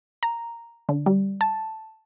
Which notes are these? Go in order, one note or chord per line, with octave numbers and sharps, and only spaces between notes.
A#5
D3
G3
A5